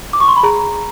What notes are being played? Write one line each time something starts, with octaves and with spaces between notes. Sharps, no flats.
D6
C#6
C6
B5
G#4 A#5